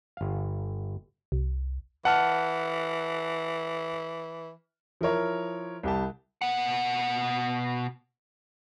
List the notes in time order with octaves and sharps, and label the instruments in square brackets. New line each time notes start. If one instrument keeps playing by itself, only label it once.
[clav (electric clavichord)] G1 F5
[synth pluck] C2
[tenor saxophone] E3 [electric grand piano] F#5 A5 F6
[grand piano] F3 E4 A#4 C#5
C2 G4 A5
[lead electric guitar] B2 F#5